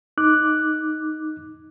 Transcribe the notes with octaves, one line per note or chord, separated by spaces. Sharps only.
D#4 D6 F#6